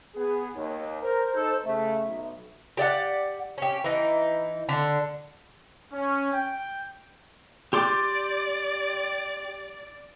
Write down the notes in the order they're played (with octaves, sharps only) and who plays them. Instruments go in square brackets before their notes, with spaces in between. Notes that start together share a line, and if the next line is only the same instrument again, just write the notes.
[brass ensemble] B3 G#4
[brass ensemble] D#2 [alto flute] C#5
[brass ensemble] A#4 [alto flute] C5
[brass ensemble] D#4 A4
[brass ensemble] C#3 A3 [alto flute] E5
[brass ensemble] B1
[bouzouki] G4 D5 E5 F#5
C#4 G4
E3 D#4
D3
[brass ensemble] C#4
G5
[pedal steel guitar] G4 C6 D6 [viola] D5